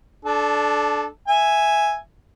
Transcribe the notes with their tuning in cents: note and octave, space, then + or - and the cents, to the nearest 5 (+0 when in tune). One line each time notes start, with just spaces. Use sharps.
D4 +0 A4 -25
E5 +0 G#5 +0